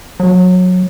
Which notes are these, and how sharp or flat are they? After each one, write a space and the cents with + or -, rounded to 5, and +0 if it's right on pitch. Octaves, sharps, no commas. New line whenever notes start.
F#3 -20